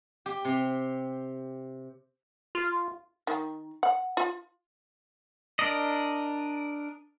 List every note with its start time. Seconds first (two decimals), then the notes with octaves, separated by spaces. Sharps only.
0.26 G4
0.45 C3
2.55 F4
3.27 D#3
3.83 F#5
4.17 F4
5.59 D4 A#4 D5 D#5